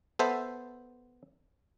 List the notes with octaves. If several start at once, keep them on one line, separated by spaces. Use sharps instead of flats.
B3 A4 C5 E5